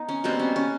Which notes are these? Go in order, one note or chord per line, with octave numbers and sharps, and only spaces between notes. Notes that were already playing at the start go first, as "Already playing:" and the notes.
Already playing: B3 D#4
C#4
B2 G3 A#3 C4
C#4
C#4